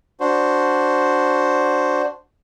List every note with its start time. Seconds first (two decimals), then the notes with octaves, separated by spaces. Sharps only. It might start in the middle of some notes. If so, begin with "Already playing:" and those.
0.20 D4 F#4 C5